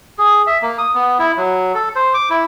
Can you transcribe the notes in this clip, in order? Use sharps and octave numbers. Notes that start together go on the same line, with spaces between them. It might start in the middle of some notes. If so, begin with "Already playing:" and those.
G#4
E5
A#3
D#6
B3
E4
F#3
A4
C5
D6
E4